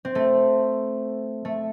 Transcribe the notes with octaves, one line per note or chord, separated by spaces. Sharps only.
C4
A3
A3